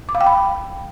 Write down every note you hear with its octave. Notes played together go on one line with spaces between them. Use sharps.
D6
F5
G5
B5